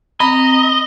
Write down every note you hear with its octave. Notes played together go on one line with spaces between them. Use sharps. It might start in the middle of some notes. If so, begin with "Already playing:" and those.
C4 D#5 A#5 B5